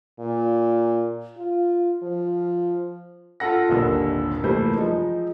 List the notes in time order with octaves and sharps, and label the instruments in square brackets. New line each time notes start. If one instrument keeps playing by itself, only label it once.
[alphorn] A#2
F4
F3
[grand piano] F4 A4 F#5 A#6
D#1 G#1 D#2 D3 E6
F1 E3 G3 A3 A#3 C5
F3 G#3 D#4